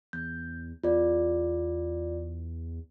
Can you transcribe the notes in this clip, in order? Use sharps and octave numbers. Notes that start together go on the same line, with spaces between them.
E2 G6
E2 F4 D5